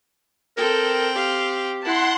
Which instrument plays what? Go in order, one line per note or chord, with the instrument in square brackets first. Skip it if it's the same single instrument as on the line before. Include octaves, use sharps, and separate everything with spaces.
[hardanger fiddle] C4 G5 [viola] A4 [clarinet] A#4
[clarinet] G4 [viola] F5
[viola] E4 A5 [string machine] F#5 C6